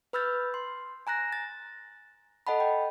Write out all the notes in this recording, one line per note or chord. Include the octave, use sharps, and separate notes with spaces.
B4 B5 E6 F6 G6 A6
C6
G#5 A#5 F#6 A#6
A6
A4 D#5 F#5 A5 B5
G5